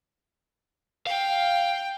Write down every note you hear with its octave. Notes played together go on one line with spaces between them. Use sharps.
F5 G5